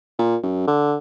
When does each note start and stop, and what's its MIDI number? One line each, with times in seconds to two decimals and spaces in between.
0.19 0.36 46
0.43 0.67 42
0.67 0.96 50